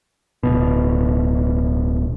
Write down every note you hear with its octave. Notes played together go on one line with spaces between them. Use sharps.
D1 G#1 B2